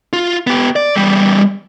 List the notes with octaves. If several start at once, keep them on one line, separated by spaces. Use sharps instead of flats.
F4
B3 G4
D5
E2 G3